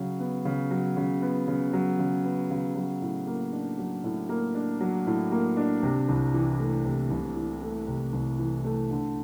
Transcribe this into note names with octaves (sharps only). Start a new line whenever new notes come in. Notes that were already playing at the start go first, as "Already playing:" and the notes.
Already playing: C#3 F#3
B3
C#3
F#3
C#3
B3
C#3
F#3
C#3
B3
C#3
F#3
A2
A#3
D4
F#3
A2
A#3
D4
F#3
A2
A#3
D4
C3
C2
E3
A3
C3
C2
E3
A3
C3
C2
E3
A3
D3